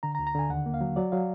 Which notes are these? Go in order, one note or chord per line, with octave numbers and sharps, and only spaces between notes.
D3 A#5
A#5
D2
A#5
D3 G#5
D#2 F#5
A#3
F5
F#3
F#3 D5
F#3 F5